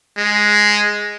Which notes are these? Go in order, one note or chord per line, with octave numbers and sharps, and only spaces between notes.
G#3